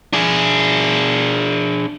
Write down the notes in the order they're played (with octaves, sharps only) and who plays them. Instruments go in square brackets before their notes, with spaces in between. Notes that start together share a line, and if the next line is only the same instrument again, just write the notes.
[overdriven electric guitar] D4 G#4